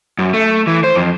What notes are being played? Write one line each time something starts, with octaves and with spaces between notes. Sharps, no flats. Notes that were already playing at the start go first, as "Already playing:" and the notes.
F#2
A3
E3
C5
F2